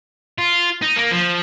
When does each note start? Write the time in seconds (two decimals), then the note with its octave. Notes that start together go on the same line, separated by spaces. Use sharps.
0.38 F4
0.82 D#4
0.96 A#3
1.11 F3